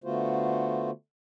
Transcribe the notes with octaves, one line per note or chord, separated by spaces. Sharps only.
D3 A3 B3 F4 F#4 C5